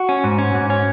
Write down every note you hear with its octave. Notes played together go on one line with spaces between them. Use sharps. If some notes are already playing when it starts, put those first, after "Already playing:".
Already playing: F#4
C#4
G#2
C#4
G#2
C#4